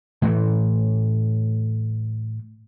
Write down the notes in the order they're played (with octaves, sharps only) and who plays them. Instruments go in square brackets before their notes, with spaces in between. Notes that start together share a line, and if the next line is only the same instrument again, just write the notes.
[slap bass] A2 E3 A3